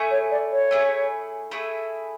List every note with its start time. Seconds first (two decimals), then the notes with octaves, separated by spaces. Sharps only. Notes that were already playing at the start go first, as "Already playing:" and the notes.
Already playing: A3 E4 G#4
0.11 C#5
0.31 D5
0.51 C#5
0.71 A3 E4 G#4
1.51 A3 E4 G#4